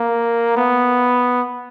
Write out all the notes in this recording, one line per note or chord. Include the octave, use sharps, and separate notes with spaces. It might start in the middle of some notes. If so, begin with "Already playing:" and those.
Already playing: A#3
B3